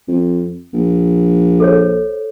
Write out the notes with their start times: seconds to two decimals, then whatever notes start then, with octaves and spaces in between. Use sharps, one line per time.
0.08 F2
0.74 A#1
1.60 A4 C5 C#5